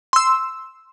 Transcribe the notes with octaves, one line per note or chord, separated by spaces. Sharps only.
C6 E6